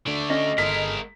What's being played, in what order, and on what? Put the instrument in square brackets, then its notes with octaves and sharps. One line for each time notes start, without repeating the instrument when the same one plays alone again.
[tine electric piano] D3 [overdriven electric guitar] A3 D5
[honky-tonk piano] C#4 [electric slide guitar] D#5
[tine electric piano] G1 A4 F6 [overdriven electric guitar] G#3 A#4 [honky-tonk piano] B6